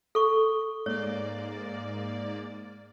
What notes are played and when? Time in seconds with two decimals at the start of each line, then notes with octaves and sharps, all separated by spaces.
0.15 A4 C#6
0.86 G#2 A#3 C#5 D5